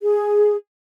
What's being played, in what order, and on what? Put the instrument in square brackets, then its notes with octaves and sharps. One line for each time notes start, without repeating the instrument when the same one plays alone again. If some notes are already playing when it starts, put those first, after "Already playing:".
[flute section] G#4